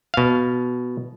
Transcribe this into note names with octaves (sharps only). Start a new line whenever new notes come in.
B2 F5